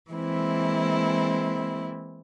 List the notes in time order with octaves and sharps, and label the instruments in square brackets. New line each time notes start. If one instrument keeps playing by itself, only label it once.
[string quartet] E3 G#3 A#3 C4 E4